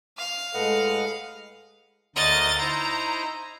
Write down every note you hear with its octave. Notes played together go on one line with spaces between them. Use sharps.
F5
A2 G#3 A4 B4 D#5 F#5
D2 A#4 D#5 D#6 A6
D#4 E4 C5 A#5